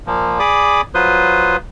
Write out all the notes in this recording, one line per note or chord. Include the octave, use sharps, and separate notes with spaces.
A#2 F3 A#3
G#4 D5 B5 D6 D#6
F#3 F4 B4 C5 C6 D#6